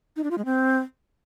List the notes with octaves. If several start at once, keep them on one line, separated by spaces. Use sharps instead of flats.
D#4
D4
F4
G#3
C4